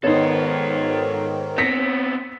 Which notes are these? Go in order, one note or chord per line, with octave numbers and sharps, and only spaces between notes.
G#2 D#3 B3 D#4 A4 C5 C#5
B3 C4 A#6 B6 C#7